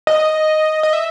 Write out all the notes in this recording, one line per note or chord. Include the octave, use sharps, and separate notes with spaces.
D#5
D#5
E5